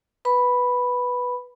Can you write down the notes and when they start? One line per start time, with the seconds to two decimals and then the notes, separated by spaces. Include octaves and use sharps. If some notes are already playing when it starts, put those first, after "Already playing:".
0.25 B4 B5